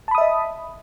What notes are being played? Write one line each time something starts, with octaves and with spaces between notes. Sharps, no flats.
D#5 E5 A5 B5 D#6